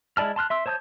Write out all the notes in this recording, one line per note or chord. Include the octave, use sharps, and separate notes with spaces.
G#3 E4 D5 A5 F6
A5 C6 F6 F#6
E5 C6 E6
C5 C#5 A5 D#6 G6